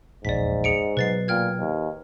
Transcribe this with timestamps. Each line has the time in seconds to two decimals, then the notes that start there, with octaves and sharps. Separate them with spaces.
0.25 D#1 A#1 E2 G#2 D5 B6
0.64 G#4 C#7 D7
0.97 B2 F#3 B4 A6 C7
1.28 A#2 G5 F6 G#6
1.59 D#2